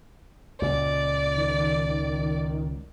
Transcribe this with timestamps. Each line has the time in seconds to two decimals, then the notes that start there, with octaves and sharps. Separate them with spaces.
0.62 C#2 A#2 D5
1.37 D#3